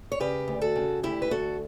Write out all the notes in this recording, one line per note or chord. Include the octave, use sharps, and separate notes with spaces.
C#5
C#3 G4 B4
D2
F#4 A4
C#3
D2 E4 G4
B4
D2 F#4 A4